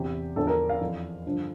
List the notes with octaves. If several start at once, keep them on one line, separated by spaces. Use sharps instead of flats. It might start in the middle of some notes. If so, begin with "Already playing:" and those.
Already playing: E2 C3 E3 G4
E2 D3 F3 A4
A#4
F5
F2 E3
G2 D3 F3